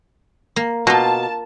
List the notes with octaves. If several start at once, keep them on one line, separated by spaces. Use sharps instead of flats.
A#3
B2 A#3 F4 A5